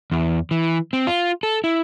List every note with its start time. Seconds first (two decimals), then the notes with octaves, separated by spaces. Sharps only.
0.12 E2
0.51 E3
0.93 C4
1.07 F4
1.43 A4
1.64 E4